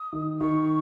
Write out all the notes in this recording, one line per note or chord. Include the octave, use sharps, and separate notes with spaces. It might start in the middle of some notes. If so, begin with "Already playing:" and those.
Already playing: D#6
D#3
D#3 C#6